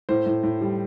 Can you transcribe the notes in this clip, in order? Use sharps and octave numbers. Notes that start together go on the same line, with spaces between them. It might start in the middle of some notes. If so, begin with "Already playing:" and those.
A2 C5
A2
A2
G3